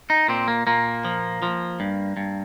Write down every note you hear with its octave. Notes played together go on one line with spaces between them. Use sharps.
D#4
A#2 C4
A#3
A#2 A#3
F3
F3
G2
G2